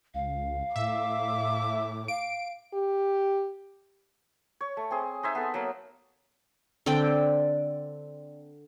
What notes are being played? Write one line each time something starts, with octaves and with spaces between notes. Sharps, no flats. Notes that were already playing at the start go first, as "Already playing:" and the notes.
C#2 F5
A2 E5 D6
F5 D7
G4
C#5
A3
C4 G#4
D#4 C5 E5 G#5
B3 A4
F#3 A#3
D3 C4 D5 G5